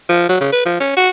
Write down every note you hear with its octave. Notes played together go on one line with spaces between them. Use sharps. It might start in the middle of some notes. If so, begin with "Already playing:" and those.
F3
F#3
C#3
B4
F3
C#4
F#4